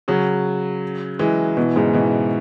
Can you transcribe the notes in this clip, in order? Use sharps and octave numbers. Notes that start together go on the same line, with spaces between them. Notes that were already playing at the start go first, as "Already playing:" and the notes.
C#3 F#3
E3 G#3
B2 E3
G#2 C#3
B2 E3